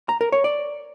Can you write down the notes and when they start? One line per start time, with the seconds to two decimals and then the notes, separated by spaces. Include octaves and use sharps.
0.09 A#5
0.21 A#4
0.32 C#5
0.44 D5